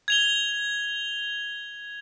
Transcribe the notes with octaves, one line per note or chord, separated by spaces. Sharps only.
G#6 F7 G7